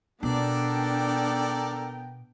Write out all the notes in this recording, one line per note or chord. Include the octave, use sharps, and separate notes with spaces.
B2 B3 D4 A4 A#4 D5 G5